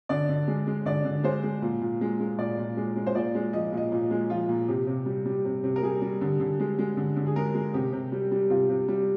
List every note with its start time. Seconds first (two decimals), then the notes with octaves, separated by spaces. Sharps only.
0.09 D3 D5
0.29 D3
0.48 G#3
0.67 G#3
0.85 D3 D5
1.05 D3
1.24 G#3 C5
1.44 G#3
1.62 A#2
1.81 A#2
2.01 G#3
2.20 G#3
2.38 A#2 D5
2.58 A#2
2.77 G#3
2.96 G#3
3.07 C5
3.15 A#2 D5
3.35 G#3
3.53 F3 D#5
3.73 A#2 D#5
3.92 A#2
4.11 G#3
4.30 F3 F4
4.49 A#2
4.68 C3 G4
4.87 C3
5.06 G3
5.25 G3
5.45 C3
5.64 C3
5.76 A#4
5.82 G3 G#4
6.02 G3
6.21 D3
6.40 D3
6.60 G#3
6.79 G#3
6.97 D3
7.16 D3
7.26 G#4
7.36 G#3 A#4
7.55 G#3
7.74 C3 G4
7.92 C3
8.12 G3
8.31 G3
8.50 C3 F4
8.70 C3
8.88 G3